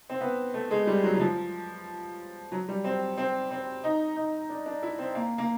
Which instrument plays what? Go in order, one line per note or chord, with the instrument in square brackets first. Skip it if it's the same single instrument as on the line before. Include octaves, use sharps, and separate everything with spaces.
[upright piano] C4
B3
A3
G#3
G3
F#3
F#3
F3
F#3
G3
C4
C4
C4
D#4
D#4
D4
D4
E4
C4
A#3
A#3